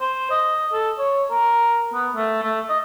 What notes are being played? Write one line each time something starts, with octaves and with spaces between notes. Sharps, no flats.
C5
D#5
A4
C#5
A#4
B3
A3
A3
D#5